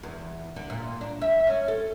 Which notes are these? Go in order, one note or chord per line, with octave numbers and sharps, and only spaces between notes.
E2
D3
A#2
D4
E5
C#4
A4